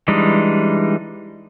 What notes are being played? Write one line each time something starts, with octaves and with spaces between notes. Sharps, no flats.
E3 G3 G#3 D4 D#4